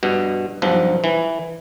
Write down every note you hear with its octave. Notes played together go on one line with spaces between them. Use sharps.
G2 B2
B1 G2 F3
E3